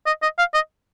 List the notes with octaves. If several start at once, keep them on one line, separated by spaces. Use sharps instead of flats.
D#5
D#5
F5
D#5